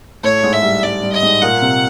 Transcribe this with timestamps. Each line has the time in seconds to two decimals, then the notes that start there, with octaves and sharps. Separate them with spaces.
0.23 A2 A3 C#5
0.43 G#2 G#3
0.53 E5
0.63 G3
0.83 G3 D5
1.03 G3
1.13 D#5
1.22 G#2 G#3
1.42 A#2 A#3 F#5
1.62 C3 C4